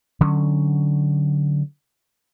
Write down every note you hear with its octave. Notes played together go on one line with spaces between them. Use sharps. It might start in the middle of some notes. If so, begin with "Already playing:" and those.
D3 F#3 C#4